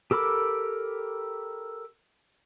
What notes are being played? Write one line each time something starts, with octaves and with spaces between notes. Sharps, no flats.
G4 A4 A#4 B5 D6